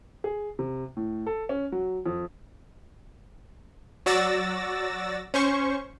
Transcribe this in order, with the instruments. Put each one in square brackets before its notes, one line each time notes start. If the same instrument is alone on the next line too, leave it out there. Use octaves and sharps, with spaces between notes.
[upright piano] G#4
C3
A2
A4
C#4
F#3
F2
[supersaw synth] F#3 F#4 D5 E6 A6 A#6
C#4 C5 C#6